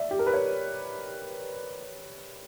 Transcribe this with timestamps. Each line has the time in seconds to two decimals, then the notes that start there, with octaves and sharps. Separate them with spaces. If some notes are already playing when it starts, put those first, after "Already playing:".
Already playing: D5 E5
0.11 G4
0.19 A#4
0.26 B4
0.33 C#5